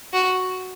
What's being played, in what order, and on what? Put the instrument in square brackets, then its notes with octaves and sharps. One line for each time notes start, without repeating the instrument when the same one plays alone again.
[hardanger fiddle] F#4